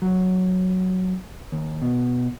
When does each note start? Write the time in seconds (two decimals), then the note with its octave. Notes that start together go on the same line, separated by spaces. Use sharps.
0.02 F#3
1.52 D#2
1.82 B2